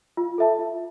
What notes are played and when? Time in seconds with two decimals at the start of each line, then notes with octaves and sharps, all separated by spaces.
0.17 F4
0.38 A4 E5 A5
0.59 F4